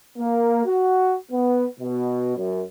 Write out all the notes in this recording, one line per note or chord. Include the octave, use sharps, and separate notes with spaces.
A#3
F#4
B3
B2
F#2